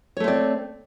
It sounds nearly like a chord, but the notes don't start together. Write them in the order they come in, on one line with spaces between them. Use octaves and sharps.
C#5 A3 C4 D5